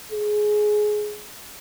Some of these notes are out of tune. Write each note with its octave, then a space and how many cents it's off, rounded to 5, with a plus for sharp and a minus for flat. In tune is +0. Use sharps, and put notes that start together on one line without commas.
G#4 +15